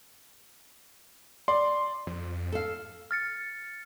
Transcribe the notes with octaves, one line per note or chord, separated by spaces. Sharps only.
D5 C6
F2
A4 F5
F6 A6 C#7